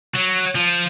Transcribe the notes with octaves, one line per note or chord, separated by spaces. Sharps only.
F#3
F3